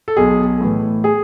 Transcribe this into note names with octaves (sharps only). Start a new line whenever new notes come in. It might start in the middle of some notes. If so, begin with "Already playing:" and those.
A4
B1 G#4
A2 E3
G#4